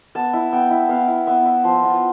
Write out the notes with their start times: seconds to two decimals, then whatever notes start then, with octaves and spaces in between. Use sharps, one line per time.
0.15 B3 A5
0.33 E4
0.53 B3 G5
0.71 E4
0.89 B3 F5
1.08 E4
1.27 B3 E5
1.46 E4
1.64 F3 C5
1.83 B3 F4